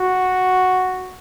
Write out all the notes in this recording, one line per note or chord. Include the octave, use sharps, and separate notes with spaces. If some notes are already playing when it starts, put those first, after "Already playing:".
Already playing: F#4